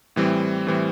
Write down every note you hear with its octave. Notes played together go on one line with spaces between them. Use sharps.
A2 E3 G3 C4
A2 E3 G3 C4